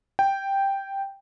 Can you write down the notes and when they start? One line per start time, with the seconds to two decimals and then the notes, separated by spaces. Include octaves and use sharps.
0.19 G5